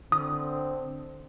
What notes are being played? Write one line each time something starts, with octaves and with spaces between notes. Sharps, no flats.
D3 C4 D#6